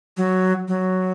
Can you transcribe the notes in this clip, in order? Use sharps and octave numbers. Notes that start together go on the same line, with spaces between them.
F#3
F#3